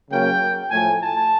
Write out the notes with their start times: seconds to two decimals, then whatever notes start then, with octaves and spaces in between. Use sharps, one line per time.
0.11 C#3 F#3 A#3 C#4 G5
0.70 A2 F3 A3 G#5
1.00 A5